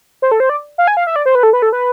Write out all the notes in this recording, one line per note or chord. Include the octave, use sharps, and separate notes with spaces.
C5
A4
C5
D5
F5
G#5
F5
E5
D5
C5
B4
A4
B4
A4
B4